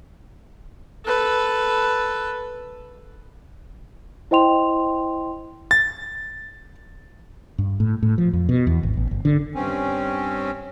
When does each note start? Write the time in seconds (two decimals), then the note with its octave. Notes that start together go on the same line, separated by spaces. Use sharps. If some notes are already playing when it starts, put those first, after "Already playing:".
1.06 A4 B4
4.31 E4 C5 D#5 G5 C6 F7
5.71 A6
7.58 G2
7.80 A2
8.03 A2
8.18 F3
8.33 F2
8.49 B2
8.67 E2
8.83 G#1
8.97 A1
9.11 G1
9.25 D3
9.55 G2 C4 C#4